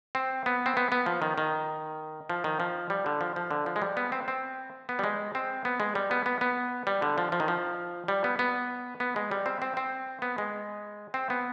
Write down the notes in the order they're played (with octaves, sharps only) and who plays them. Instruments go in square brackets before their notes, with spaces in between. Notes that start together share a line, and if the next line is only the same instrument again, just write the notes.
[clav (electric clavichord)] C4
B3
C4
B3
B3
F3
D#3
D#3
F3
D#3
F3
G3
D3
F3
F3
D3
F3
G#3
G3
B3
C4
C4
B3
G3
G#3
C4
B3
G#3
G3
B3
B3
B3
G3
D3
F3
F3
D#3
F3
G3
B3
B3
B3
G#3
G3
C4
C4
C4
B3
G#3
C4
B3